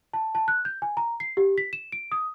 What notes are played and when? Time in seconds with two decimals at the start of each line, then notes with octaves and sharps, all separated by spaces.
0.13 A5
0.35 A5
0.48 F#6
0.65 G6
0.82 G#5
0.97 A#5
1.20 C7
1.37 G4
1.58 B6
1.73 E7
1.92 D7
2.12 D#6